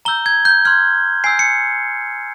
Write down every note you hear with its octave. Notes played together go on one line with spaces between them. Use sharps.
A#5 E6 G6 G7
G#6
G6
C6 F6 G#6
G#5 E6 G6 C7
C#7